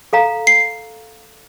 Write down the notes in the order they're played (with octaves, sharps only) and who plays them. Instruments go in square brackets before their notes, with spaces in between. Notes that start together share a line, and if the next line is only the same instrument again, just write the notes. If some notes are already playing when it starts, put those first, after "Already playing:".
[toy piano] A4 F5 A#5
[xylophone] C7